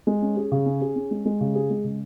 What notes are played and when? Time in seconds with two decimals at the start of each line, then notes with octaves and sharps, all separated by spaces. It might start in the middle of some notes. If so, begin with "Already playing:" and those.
0.07 G#3
0.22 C#4
0.37 G#4
0.52 C#3
0.66 C#4
0.81 G#4
0.96 C#4
1.11 G#3
1.25 G#3
1.41 C#3
1.55 G#4
1.70 G#3
1.84 C#3